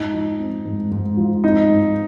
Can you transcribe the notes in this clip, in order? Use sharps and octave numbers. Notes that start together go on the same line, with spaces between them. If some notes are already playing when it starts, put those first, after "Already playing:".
Already playing: G#2 D#4
F3
C4
G#2
G#2
F3
C4 D#4
G#2